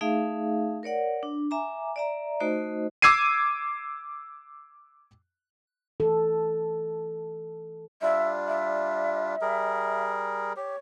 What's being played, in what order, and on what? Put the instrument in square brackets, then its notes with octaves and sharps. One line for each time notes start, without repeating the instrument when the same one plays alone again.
[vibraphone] A3 D#4 G#4 E5 F5
A#4 C#5 D5 F#5
D4
E5 G#5 A#5 D6
D5 E5 A#5
A3 D#4 F#4 C5 D#5
[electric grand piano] D6 E6 G#6 C7 D#7
[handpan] E3 A4
[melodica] G3 D4 F4 [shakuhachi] E5
[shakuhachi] E5
[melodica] G3 G#4 A#4
[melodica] G4 [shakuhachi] C#5